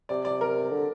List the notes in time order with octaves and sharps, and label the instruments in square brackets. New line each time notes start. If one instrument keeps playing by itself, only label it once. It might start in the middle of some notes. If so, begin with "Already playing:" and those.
[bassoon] C3 [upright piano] D5
[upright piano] D5
A#4
[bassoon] D3